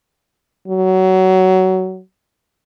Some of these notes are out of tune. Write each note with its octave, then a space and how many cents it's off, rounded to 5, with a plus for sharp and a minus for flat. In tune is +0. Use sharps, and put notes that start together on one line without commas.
F#3 +20